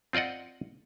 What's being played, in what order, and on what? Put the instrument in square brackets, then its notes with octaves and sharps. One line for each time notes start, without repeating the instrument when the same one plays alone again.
[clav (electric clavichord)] C4 F4 D5 D#5 F#5